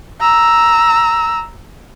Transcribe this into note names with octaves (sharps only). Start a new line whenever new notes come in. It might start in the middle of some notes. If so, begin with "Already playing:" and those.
A#5 E6